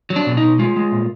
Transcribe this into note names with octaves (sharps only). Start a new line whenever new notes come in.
F#3
D4
B2
D#4
B2
G#3 F4
G#3
A#2